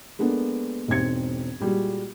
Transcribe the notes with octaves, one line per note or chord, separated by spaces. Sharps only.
G#3 A#3 B3 D4 A4
E1 G#2 C4 G#6 C#7
A#2 G3 G#3 F#4